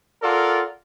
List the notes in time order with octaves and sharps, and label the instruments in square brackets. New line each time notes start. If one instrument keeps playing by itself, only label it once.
[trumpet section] F4 A4 A#4 D5 F#5